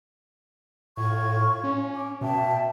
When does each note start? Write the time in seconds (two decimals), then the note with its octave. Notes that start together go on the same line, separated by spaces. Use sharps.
0.97 A2 F4 C#6 G#6
1.64 C#4
1.95 D6
2.21 B2 E5 G5 A5